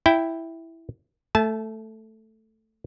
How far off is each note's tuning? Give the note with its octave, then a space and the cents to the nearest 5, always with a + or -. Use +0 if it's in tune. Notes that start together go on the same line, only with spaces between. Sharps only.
E4 +0 G5 +0
A3 +0 A5 -30